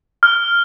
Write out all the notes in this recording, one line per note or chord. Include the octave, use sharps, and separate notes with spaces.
F6